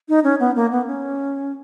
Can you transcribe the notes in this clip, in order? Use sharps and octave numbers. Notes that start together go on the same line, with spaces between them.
D#4
C#4
B3
A#3
B3
C#4